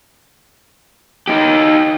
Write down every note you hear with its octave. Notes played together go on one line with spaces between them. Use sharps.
D#4 G4